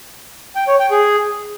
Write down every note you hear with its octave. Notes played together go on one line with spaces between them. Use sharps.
G5
C#5
G5
G#4